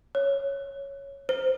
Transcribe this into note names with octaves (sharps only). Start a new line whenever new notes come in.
C#5
C5